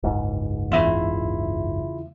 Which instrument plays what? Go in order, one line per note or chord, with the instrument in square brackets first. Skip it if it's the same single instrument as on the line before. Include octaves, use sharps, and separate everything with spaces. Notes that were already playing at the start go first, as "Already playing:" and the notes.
[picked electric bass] F#1 C#2 G#2
[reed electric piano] E2 E5 [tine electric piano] C#3 E4 F4